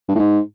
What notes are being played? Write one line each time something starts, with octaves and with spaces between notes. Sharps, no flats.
G2
A2
G#2